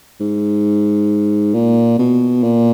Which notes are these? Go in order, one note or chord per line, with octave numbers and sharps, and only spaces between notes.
G#2
A#2
B2
A#2